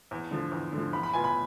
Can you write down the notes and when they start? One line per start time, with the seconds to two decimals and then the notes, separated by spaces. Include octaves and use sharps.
0.11 E2
0.31 D3 F3
0.51 E2
0.73 D3 F3
0.93 E2 B5
1.03 B5
1.14 B2 B3 F4 G#5
1.24 B5